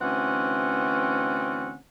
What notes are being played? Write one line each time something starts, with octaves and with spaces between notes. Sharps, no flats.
D2 E3 C4 C#4 F#5